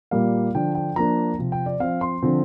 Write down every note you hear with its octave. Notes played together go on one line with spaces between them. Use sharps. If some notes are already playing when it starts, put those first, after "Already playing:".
A#2 G3 A#3 F5
D3 F3 D4 G5
G5
F3 A#3 D4 A#5
C3 F3 C4
G5
D5
F3 C4 F5
C6
D3 F3 C4